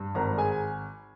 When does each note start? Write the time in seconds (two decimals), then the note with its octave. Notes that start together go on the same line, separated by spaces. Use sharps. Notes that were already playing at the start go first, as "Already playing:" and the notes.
Already playing: G2
0.15 G#1 A#4 A#5
0.37 G#4 G#5